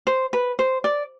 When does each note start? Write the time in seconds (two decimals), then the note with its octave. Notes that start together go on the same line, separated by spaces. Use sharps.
0.07 C5
0.33 B4
0.59 C5
0.84 D5